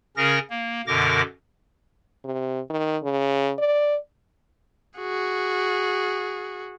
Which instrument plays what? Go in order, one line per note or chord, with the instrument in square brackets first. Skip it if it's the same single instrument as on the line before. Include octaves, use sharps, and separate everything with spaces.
[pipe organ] C#3 C#4 G#4 A#4 A#6
A#3
F#2 B2 D3 A#4 D6 A#6
[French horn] C3
D#3
C#3
D5
[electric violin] F#4 G#4